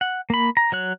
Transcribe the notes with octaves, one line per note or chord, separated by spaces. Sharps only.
F#5
A#3 B5
A#5
F#3 C#5 F#6